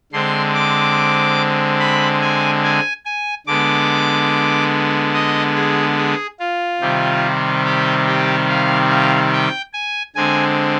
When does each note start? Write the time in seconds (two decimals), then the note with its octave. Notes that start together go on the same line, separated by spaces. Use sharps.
0.12 D3 G#3 C4 C6
0.55 D6
1.79 B5
2.21 G#5
2.64 G#5
3.05 G#5
3.47 D3 G#3 B3 D6
5.14 D#5
5.55 G#4
5.98 G#4
6.39 F4
6.81 C3 D#3 G3 C4
7.64 G4
8.06 G4
8.49 F5
8.90 F5
9.32 G5
9.73 G#5
10.15 D3 G#3 C4 G#5